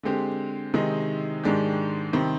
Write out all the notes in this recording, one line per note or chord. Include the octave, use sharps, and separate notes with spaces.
D3 G#3 C4 G4
C3 D#3 G#3 C4 D#4
G#2 D#3 G#3 D4 G4
C3 D#3 G3 C4